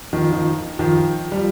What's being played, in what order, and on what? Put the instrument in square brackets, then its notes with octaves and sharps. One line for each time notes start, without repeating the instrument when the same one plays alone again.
[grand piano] D#3 F3
D#3 F3
D#3 F3
F3 G3